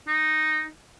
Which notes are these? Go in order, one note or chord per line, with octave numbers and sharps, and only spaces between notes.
D#4